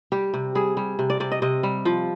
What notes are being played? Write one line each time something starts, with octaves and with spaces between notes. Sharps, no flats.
G3 G4
C3
G3 G#4
G3
C3
D5
C3 D5
D#5
C3 D#5
G3
F3